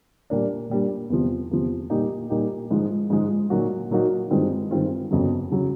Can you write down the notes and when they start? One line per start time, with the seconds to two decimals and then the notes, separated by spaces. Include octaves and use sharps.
0.30 A#2 G3 A#3 D4
0.70 A#2 G3 A#3 D4
1.10 E2 C3 F3
1.51 E2 C3 F3
1.90 A#2 G3 A#3 D#4 G4
2.30 A#2 G3 A#3 D#4 G4
2.71 G#2 F3 G#3
3.10 G#2 F3 G#3
3.50 A#2 F#3 A#3 D#4 F#4
3.91 A#2 F#3 A#3 D#4 F#4
4.30 G2 D#3 G#3 C4 F4
4.71 G2 D#3 G#3 C4 F4
5.11 G1 F2 C#3 F#3
5.51 C#3 F#3